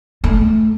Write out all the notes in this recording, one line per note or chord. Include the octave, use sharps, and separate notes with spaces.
A3